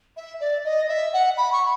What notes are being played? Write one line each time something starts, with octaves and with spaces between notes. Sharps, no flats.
E5
D5
D#5
E5
F#5
B5
C#6